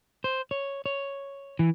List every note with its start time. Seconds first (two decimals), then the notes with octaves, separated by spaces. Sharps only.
0.24 C5
0.51 C#5
0.86 C#5
1.59 E3